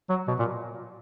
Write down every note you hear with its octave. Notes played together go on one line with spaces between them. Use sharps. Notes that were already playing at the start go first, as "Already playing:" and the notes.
F#3
B2
A#2